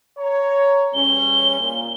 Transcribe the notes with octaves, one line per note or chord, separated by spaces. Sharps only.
C#5 A#5
E2 G3 C#4 G7
A#2